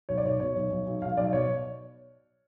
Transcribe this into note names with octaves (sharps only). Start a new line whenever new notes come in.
B1 C#5
D5
B1 C#5
B2 C#5
B1
B1
B1
B1 F5
B1 D5
B2 C#5